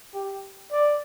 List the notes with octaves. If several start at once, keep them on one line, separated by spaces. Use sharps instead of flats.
G4
D5